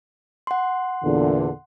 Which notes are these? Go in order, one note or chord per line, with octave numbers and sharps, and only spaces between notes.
F#5 C6
E2 A#2 D3